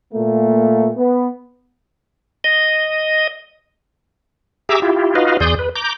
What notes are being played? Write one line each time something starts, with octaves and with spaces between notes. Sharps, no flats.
A#2 A3 A#3
B3
D#5
G4 G#4 E5 A#5 D6 E6
E4 F4 G4
D#4 F4 F#4 B4 D#5 F5
E2 G#4 D5 C6 D#6 G6
B4
A#5 D6 G6